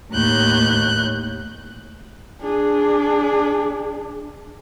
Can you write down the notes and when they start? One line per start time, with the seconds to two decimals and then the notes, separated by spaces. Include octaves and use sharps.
0.13 D#2 A2 F#6 G6
2.42 D4 G#4